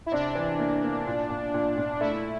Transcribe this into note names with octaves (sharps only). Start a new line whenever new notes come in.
E4
C3 D4
E3
A#3
A#3
A#2
A#2
A#2
A#2
A3 E4